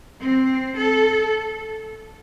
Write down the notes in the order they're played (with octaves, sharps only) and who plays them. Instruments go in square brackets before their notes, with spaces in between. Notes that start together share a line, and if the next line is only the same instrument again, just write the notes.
[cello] C4
A4